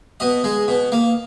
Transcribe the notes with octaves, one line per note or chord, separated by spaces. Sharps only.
B2 D#5
G#3
B2
A#3